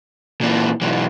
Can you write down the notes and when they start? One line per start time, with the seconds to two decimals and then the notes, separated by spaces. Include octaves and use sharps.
0.41 A#2 E3
0.82 B1 E3